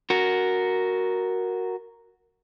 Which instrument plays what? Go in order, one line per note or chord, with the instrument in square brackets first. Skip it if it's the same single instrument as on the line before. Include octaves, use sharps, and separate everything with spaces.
[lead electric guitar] F#4 A#4